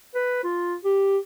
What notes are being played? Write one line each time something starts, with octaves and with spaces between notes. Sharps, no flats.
B4
F4
G4